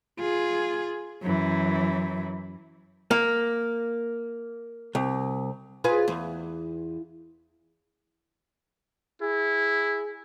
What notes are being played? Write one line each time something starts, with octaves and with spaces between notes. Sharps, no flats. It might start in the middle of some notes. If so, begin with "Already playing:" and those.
F4 G#4
F#2 E3
A#3
C2
F4 G#4 B4
E2
E4 G#4